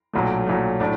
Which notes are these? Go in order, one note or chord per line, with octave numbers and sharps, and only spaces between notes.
B1 A#2 F#3 A3
B1 A#2 F#3 A3
A2 F#3 A3 D4